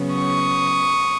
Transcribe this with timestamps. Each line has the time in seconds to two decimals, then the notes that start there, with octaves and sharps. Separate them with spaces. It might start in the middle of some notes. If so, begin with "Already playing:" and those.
Already playing: C#3 F#3 B3
0.14 C#6 D#6